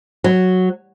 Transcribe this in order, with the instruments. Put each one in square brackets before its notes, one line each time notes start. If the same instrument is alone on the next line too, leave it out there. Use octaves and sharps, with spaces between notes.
[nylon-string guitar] F#3